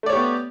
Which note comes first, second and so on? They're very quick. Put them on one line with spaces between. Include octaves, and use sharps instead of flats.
A3 D5 C#5 G4 B3